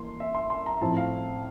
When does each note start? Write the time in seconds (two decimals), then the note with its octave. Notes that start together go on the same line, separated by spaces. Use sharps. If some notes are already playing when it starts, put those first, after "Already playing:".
Already playing: E3 A#3 C6
0.20 E5
0.35 C6
0.50 C6
0.66 A#5
0.81 A2 F3 C4 E4 A5
0.97 F5